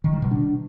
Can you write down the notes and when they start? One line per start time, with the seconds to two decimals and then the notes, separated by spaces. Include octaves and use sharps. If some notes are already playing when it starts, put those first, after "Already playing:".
0.04 D#3
0.13 G3
0.22 B2
0.31 D4